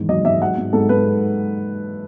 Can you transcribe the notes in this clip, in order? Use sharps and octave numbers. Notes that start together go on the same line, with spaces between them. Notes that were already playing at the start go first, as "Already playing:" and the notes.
Already playing: E2 G#2 D#3
F#3 D#5
G#2 E5
F#3 F#5
G#2
G#2 A4
G#2 B4